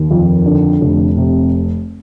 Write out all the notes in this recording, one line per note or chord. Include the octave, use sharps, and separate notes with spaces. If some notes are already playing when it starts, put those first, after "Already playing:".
Already playing: D#2
F2
D3
F1
C3